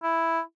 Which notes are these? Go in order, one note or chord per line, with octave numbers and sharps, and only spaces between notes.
E4